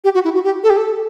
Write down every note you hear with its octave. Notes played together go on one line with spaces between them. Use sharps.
G4
F#4
E4
F#4
G4
A4
G4
A4